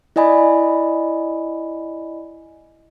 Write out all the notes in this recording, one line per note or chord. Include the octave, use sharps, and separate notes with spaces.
E4 D5 D#5 G#5 B5